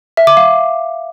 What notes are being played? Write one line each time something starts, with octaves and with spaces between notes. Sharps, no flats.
E5
D6
F5